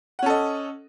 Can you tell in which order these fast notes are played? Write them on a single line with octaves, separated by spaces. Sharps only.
F#5 C#4 A4 D#5